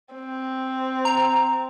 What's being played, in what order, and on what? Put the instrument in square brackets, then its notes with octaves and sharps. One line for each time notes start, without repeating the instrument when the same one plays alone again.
[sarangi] C4
[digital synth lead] A#5